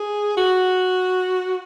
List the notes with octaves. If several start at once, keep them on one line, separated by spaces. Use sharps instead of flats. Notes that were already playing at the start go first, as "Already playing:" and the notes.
Already playing: G#4
F#4